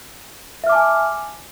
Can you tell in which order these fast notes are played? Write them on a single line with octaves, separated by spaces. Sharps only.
E5 F6 D6 A5 G#5